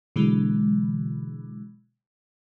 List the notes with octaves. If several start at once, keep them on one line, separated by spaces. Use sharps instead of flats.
B2 D3 E3 F#3 G#3